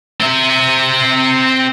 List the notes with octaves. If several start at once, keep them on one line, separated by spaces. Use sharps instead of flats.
C4 E5